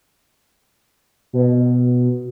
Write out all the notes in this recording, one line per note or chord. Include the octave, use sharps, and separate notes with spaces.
B2